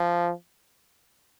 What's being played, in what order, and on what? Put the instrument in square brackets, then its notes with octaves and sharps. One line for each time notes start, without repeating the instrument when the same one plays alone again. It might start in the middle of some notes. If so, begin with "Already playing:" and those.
Already playing: [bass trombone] F3